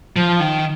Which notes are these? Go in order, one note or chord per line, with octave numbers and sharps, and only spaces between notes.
F3
D#3